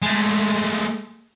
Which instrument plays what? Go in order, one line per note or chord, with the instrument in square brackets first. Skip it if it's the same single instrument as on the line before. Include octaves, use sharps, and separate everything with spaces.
[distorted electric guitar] G#3 A3